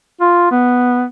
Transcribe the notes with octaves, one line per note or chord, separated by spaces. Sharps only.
F4
B3